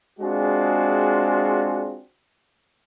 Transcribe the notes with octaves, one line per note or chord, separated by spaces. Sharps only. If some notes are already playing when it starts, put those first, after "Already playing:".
G#3 C4 D4 F4 F#4 G#4